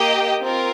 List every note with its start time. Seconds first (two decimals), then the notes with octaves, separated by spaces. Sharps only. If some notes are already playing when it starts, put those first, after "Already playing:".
Already playing: A#3 G4 D#5 G5
0.41 C4 F4 A#4